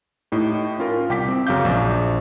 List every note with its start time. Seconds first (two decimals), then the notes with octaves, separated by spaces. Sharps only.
0.32 A2 D#4 G4
0.79 C#4 F4 A#4
1.09 C2 G5 D6 B6
1.28 C4
1.47 F#2 C#3 F5 D6 G6
1.65 A#1